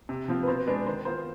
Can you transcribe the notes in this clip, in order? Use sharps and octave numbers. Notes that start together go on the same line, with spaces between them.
C3
F3 C4 F4
B4
B2 C5
G#3 D4 B4
D#3 C5
B3 F4 C5